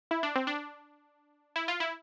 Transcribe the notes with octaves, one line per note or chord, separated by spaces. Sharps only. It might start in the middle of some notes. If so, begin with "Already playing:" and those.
E4
D4
C4
D4
E4
F4
E4